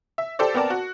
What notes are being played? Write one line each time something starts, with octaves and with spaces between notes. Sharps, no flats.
E5
G4 A4 C5 D5
B3 C4 A#4 D5 A5
F#4